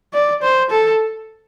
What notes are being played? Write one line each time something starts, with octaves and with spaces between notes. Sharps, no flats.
D5
C5
A4